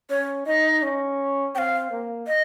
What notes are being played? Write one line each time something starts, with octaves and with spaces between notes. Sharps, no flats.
C#4 C#5
D#4 D#5
C#4
C4 F5 G5
A#3
D#5